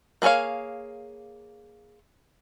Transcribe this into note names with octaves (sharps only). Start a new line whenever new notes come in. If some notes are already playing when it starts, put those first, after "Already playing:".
A#3 G#4 A4 C#5 F5